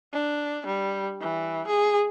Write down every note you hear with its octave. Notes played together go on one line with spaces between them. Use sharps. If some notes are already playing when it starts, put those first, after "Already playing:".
D4
G3
E3
G#4